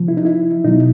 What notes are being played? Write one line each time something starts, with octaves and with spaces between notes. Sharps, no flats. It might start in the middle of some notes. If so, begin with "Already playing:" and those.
Already playing: C3 F3
E4
D#4
E4
B2 F#3 D#4